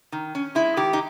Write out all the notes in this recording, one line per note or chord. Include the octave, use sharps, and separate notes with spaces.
D#3
C#4
G#3 E4
D#3 G4
D#4